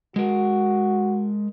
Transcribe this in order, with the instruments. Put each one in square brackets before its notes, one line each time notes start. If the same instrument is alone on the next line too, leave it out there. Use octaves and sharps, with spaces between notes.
[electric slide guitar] G#3 A#4 [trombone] F#4